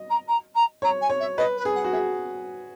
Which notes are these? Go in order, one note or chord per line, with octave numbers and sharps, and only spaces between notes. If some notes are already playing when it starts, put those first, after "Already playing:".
Already playing: D#5
A#5
A#5
A#5
C#5 A#5
G#5
C#5
E5
B4 D#5
B4
G#4
F#5
F#4
G#4 E5